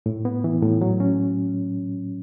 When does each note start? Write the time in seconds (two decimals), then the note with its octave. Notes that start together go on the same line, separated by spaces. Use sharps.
0.06 A2
0.25 B3
0.44 E3
0.62 A2
0.81 F#3
1.00 C#4